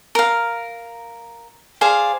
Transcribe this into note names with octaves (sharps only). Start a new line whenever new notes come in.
A#4 F5
G#4 C5 D5 F5